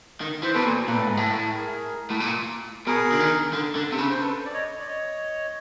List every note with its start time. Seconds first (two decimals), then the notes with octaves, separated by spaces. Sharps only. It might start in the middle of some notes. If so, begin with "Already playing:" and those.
0.21 D#3
0.43 E3 C5
0.54 B2 A4 B4
0.65 A#2
0.87 A#2 A4 B4
0.97 A2
1.07 G#2
1.17 A2
1.54 G#4 A#4
2.10 A2
2.20 A#2
2.86 B2 G#4 A#4
3.12 D3
3.20 D#3
3.53 D3
3.75 D3
3.92 C3
3.98 C#3
4.10 C5
4.20 A4 B4
4.46 D5
4.54 C#5 D#5
4.79 D5
4.86 C#5 D#5